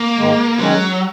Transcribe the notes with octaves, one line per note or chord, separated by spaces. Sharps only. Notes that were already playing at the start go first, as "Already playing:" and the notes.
Already playing: A#3
G#2 D#3 G#3
D#3 F#3 G#3 C#4